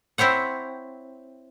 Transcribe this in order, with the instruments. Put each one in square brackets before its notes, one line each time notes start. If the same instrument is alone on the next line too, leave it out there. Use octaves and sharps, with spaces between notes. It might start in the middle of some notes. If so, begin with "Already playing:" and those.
[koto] C4 E4 C5 C#5 F#5